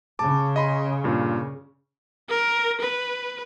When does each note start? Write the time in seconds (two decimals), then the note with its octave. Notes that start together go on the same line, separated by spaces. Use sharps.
0.19 C#3 A5 D6
0.56 D#5 B5 C6
1.04 G2 A#2
2.30 A#4
2.81 B4